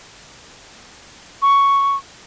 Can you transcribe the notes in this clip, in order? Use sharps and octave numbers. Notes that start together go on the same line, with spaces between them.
C#6